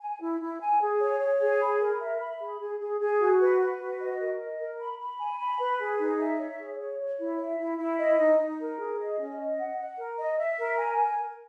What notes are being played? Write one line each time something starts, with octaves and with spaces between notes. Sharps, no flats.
G#5
E4
E4
G#5
G#4
C#5
C#5
G#4
B5
A#4
E5
B5
G#4
G#4
G#4
G#4
F#4
B4
B4
F#4
D#5
A#4
D#5
A#4
B5
B5
G#5
B5
B4
G#4
D#4
E5
C#5
G#4
C#5
C#5
E4
E5
E4
E4
D#5
D#4
D#4
A#4
G#4
D#5
C#4
D#5
F#5
F#5
A#4
D#5
E5
A#4
G#5
A#4
A#4